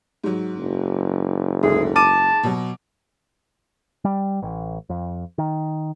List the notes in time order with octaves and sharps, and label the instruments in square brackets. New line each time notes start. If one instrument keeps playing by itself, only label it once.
[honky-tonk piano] G#2 F#3
[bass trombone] F#1
[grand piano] D2 [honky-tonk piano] G#2 [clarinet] G#4
[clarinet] A5 [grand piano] D6 D#7
[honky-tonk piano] B2 F#3
[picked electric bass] G3
A1
F2
D#3